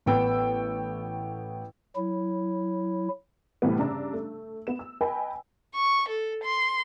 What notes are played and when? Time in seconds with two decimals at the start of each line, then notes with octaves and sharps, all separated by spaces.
0.06 A1 B3 G5 E6
1.96 F#3 E4
3.62 A2 C3 E3 G3 A3 B3
3.78 G2 C#3 D4 A#5 E6
4.13 A3
4.67 B3 E7
4.79 E6
5.01 B4 D#5 G5 G#5 B5
5.75 C#6
6.09 A4
6.44 C6